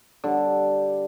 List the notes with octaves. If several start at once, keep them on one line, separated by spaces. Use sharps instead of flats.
D3 G3